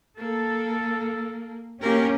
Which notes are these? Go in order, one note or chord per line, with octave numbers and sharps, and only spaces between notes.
A#3 A4
A#3 C#4 G4 A#4